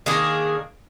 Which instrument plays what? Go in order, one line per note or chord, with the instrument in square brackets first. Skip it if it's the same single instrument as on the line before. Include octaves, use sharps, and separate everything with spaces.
[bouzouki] D#3 A#3 D4 G#4